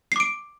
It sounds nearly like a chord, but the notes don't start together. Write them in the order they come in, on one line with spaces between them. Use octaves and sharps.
C7 D6 D7